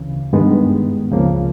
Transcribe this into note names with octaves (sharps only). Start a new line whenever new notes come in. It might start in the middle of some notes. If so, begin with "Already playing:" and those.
Already playing: D2 C#3 E3
G2 D#3 G#3 B3
C#2 C#3 F3 A#3